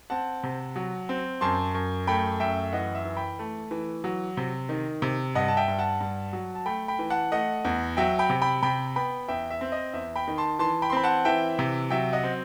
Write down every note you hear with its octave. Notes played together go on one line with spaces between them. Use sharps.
C4 F#5 A5
C3
F#3
C4
F#2 A5 C6
F#2
A3 G5 B5
F#2 E5 G5
E3 D#5 F#5
E5
E3
G5 B5
A3
E3
F#3
C3
D#3
C3
G2 D#5 F#5
A5
E5 G5
G2
F#5 A5
G2
F#3
A5
A3 G5 B5
G5 B5
E3
F#5 A5
A3 D#5 F#5
E2
F#3 E5 G5
G5 B5
C3
G5 B5
C3 G5 B5
B3 G5 B5
E2 E5 G5
E5
C4
D#5
E2 E5
G5 B5
D#3
A5 C6
E3 A5 C6
G5 B5
C6
C4 B5
F#5 A5
E3 E5 G5
C3
F#3 E5 G5
D#5 F#5
C4